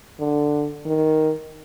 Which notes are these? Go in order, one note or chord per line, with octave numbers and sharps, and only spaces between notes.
D3
D#3